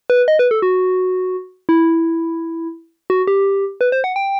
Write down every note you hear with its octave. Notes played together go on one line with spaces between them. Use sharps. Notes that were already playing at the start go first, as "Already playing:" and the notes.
B4
D#5
B4
A4
F#4
E4
F#4
G4
B4
C5
F#5
G5